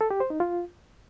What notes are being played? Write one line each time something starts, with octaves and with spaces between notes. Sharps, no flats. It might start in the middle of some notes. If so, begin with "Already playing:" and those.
A4
G4
C5
D#4
F4